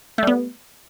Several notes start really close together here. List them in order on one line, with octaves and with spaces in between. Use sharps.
A3 G3 B3